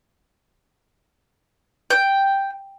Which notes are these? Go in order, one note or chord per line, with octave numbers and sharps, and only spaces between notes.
G5